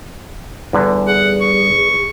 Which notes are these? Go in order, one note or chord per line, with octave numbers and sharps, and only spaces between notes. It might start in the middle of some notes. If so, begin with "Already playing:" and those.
E2 G2 D3
G#4 F#5
C#6